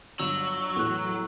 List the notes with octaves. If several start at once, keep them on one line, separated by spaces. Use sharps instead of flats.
G1 F#3 E6 F#7
E2 A2 C#6 F#6